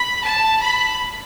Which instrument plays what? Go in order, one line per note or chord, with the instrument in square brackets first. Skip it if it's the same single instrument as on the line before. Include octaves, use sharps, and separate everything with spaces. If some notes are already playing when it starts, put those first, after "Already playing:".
Already playing: [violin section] B5
A5
B5